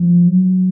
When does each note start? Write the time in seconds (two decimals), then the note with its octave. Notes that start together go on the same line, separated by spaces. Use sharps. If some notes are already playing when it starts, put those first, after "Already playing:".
Already playing: F3
0.28 F#3